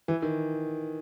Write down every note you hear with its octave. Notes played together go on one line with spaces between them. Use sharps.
E3
D#3